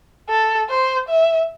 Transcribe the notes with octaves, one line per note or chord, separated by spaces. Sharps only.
A4
C5
E5